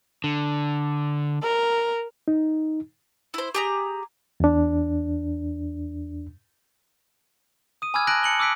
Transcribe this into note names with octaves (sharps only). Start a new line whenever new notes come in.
D3
A#4
D#4
E4 C5
G4 G#4 A#5
E2 D4
D#6 D#7
G#5 B5 D6 E6 F6 G#6
A5 F#6 G#6 A#6 D7 F#7
A5 C#7 F#7 G7
D6 E6 F#6 B6 D7